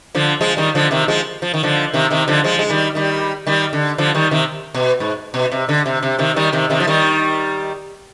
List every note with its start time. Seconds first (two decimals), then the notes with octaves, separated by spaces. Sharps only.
0.15 D3 F3
0.41 F3 G#3
0.57 D#3 G3
0.75 D3 F3
0.91 C3 D#3
1.08 F3 G#3
1.42 F3
1.54 D#3
1.63 D3 F3
1.94 C3 D#3
2.11 C3 D#3
2.28 D3 F3
2.44 F3 G#3
2.59 G#3
2.70 D#3 G3
2.95 D#3 G3
3.47 D#3 G3
3.73 D3
3.98 D3 F3
4.15 D#3 G3
4.31 C3 D#3
4.74 B2
5.00 G#2
5.34 B2
5.52 C3
5.69 D3
5.86 C3
6.03 C3
6.19 C3 D#3
6.36 D#3 G3
6.53 C3 D#3
6.70 C3 D#3
6.80 F3
6.87 D#3 G3